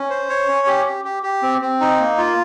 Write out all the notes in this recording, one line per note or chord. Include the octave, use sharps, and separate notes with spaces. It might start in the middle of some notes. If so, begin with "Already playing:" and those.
Already playing: C#4
C5
C#5
C#4
G4
G4
G4
G4
C4
C4
D#4
A#3
F4